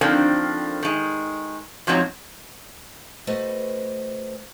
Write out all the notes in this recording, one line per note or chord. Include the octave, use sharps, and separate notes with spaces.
D3 D#3 F3 A#3 C4 D4
D#3 G#3
G#2 F3 F#3 C4 C#5 A#5
A3 F#4 B4 C5 D#5